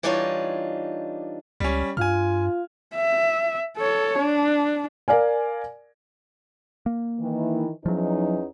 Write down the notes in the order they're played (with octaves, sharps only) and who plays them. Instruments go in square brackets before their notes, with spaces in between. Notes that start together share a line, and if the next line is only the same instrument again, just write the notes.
[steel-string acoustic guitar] E3 G3 D4 D#4 F4 C#5
[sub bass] C#2 [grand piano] G3 C#4
[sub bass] G2 [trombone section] F4 [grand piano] G#5 F6
[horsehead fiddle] E5
A4 C#5
D4
[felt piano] A#4 D5 F5 G#5
[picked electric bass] A#3
[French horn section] D#3 E3
[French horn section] E2 C#4 D#4 [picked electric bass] F3 F#3